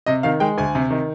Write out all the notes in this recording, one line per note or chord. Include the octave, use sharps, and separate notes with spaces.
C3 D#5
D#3 F5
G#3 G5
D2 G#5
C3
D#3